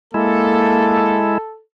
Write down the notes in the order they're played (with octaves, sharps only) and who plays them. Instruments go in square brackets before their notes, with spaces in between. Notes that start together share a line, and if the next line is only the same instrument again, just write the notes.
[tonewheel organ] G#3 E4 [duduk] A#3 [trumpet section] A4